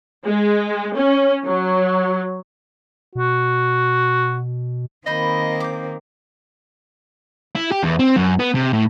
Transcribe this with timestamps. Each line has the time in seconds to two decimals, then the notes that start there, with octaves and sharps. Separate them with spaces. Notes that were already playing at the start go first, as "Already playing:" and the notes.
0.25 G#3
0.94 C#4
1.45 F#3
3.15 B2 F#4
5.06 D#3 A#3 C4 C5 D#5 B5 G6
5.60 D6 G6
7.55 E4
7.72 G4
7.83 E2
7.99 C4
8.16 F#2
8.39 B3
8.55 C3
8.73 A2